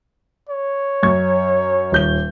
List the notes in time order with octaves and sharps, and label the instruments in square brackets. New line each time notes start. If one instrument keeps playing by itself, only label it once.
[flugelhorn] C#5
[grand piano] F#2 C#6 G#6
D#1 G6 G7